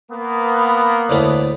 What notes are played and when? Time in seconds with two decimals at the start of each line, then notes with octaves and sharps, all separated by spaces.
0.11 A#3 B3
1.09 D2 A2 A3